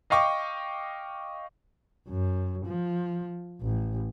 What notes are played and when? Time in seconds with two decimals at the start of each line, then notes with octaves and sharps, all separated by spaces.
0.10 D#5 F5 G5 C#6 D6
2.09 F#2
2.66 F3
3.62 A1